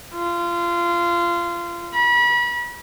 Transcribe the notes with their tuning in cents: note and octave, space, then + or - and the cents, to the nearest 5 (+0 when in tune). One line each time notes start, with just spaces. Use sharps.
F4 -25
B5 -35